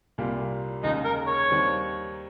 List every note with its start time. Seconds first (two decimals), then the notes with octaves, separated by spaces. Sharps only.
0.18 C2 A#2 G3 A#3
0.83 D#2 C#3 G#3 D#4
1.05 A#4
1.27 C#5
1.49 D#2 D#3 G3 C4